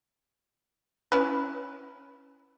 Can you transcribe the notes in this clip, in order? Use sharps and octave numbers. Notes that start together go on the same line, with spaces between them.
C#4 E4 B4